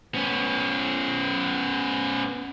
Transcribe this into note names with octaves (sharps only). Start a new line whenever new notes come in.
B3 C#4